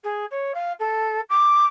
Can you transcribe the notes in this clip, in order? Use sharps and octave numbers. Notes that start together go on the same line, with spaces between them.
G#4
C#5
F5
A4
D6